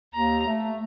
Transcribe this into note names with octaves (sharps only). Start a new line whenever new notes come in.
D#2 A#5
A3